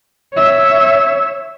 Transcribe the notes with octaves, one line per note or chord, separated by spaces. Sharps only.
C#5 E5